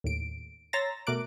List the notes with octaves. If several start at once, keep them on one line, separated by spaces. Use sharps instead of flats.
D#2 A2 D7
C#5 A#5 C6 E6 A6 A#6
B2 A3 A#4 D6 F#6 D7